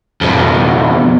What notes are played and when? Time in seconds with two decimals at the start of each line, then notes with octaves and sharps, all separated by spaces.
0.21 F2 B2